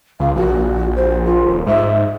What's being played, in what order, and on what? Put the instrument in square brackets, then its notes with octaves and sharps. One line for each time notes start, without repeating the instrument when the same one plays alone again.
[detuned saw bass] C#2 [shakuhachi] F5
[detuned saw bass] A#1 [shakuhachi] F#4
[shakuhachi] C5
F4
[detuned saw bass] D#1
[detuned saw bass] G#2 [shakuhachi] E5